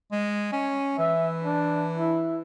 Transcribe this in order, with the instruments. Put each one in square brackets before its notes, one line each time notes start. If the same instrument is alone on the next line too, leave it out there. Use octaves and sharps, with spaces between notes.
[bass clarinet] G#3
C#4
[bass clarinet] E3 [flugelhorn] E5
[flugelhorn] D4
E4